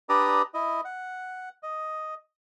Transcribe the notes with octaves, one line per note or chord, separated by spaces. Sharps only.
D4 G4 B4 D5 A#5 D#6
E4 D#5
F#5
D#5